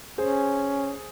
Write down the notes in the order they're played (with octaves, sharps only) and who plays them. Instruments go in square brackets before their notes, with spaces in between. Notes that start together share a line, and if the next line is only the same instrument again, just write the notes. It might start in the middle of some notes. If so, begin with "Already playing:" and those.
[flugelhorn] C#4 [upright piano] G#4 C5